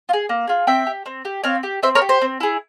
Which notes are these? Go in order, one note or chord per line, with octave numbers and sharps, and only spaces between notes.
F4
G#4
A#3
F4 G#4
C4 E5 G5
G4
C4
G4
C4 C#5 F5
G4
C4 C5 E5
A#4 C#5
G4
C5
C4
E4 G#4